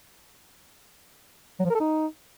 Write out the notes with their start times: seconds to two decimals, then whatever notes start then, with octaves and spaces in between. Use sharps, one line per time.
1.59 F#3
1.65 F3
1.70 A#4
1.75 A4
1.80 D#4